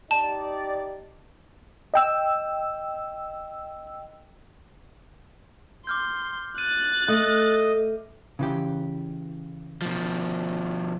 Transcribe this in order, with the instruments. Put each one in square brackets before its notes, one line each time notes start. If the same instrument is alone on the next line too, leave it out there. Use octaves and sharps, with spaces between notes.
[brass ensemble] D#4 G4 D5 [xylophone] A5
[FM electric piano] D#5 G5 E6
[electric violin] C6 [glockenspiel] D6 F6 G6
[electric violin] F#6 A6 [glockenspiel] D#7
[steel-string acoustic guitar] A3 [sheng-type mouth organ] D#5
[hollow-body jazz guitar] C#3 E3 G4
[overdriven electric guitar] B2 F3